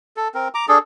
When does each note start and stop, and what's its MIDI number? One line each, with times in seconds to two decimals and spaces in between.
0.17 0.28 69
0.34 0.48 60
0.34 0.48 70
0.54 0.66 82
0.54 0.66 86
0.68 0.78 62
0.68 0.78 68
0.68 0.78 69